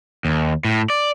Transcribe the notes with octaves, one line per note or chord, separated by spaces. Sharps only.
D#2
A2
D5